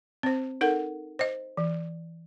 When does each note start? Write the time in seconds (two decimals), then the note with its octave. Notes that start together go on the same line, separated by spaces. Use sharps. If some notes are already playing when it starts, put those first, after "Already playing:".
0.23 C4 C5
0.61 D#4 A4 A#4 F#5
1.19 C5 D#5
1.57 E3